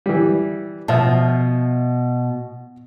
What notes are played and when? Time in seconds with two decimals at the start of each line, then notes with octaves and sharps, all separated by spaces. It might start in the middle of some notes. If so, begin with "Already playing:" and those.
0.06 E3 G3
0.88 B2 F3 E5 A5